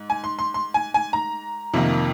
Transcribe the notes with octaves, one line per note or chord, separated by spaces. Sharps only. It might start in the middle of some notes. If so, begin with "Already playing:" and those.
Already playing: G#2
G#5
C6
C6
C6
G#5
G#5
A#5
F2 C3 D#3 A#3